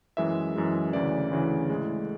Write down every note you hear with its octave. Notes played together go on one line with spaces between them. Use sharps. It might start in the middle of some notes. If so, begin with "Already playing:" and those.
F#2 E3 G#3 E5
F#2 E3 G#3
D2 C#3 E3 D5
D2 C#3 E3
A2 G#3